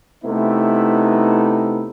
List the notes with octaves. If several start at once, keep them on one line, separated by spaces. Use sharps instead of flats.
C3 A3 B3 D#4 E4